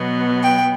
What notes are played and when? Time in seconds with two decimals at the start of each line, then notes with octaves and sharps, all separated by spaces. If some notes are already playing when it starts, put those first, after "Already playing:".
Already playing: B2 F#3 B3
0.42 G5